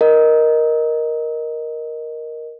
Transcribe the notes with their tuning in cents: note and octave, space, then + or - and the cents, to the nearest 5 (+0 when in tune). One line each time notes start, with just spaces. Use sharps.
A#4 +5 D#5 +0